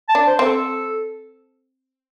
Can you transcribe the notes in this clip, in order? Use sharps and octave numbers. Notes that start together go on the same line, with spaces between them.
A5
D4
C5
C4
A4